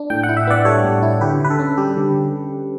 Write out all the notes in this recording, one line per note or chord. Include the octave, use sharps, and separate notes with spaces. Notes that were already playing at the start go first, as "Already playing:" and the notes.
Already playing: D4
A2 G5
F#5
E4
E5
B3 D5 F#5
G3 A4 C#5
A2
E4
D3 G4 B4
D3 B4
A4
C#4
G3 G4
D3
D3